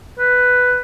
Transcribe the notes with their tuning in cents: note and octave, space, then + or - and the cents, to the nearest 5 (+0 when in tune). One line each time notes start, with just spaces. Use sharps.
B4 +5